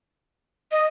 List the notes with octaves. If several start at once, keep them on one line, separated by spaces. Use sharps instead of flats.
D#5